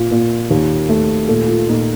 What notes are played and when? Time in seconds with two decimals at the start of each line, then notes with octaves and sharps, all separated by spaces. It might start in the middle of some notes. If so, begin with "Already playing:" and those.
Already playing: A#2 F4
0.11 A#2
0.50 D#2
0.89 A3
1.28 A#2 A4
1.48 F4
1.68 A#2 D#4